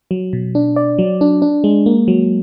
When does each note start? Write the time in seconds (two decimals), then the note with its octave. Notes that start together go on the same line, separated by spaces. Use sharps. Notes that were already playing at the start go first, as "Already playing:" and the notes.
0.11 F#3
0.33 B2
0.55 D4
0.76 D5
0.99 F#3
1.21 D4
1.42 D4
1.64 G#3
1.86 A#3
2.08 F#3